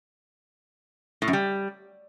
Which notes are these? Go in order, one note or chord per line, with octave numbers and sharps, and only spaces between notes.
A2
F#2
G3